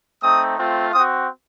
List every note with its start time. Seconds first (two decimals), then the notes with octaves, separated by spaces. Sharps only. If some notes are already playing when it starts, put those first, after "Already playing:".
0.23 A3 C4 D#4 D#6
0.59 A3 C4 F4
0.93 C4 F#4 D#6